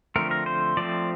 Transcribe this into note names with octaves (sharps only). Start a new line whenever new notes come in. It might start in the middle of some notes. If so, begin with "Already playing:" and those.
D3 F3 A3 C4 A#4
A#4
C5
F3 A3 C4 D5